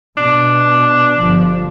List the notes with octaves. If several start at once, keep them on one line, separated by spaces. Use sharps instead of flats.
B2 D4
G1 F3